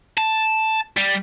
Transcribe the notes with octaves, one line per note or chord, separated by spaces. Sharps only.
A5
G3